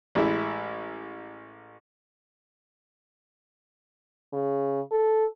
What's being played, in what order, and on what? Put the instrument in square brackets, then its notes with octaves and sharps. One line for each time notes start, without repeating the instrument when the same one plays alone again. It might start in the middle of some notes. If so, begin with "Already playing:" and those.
[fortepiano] A1 G#3 E4
[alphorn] C#3
A4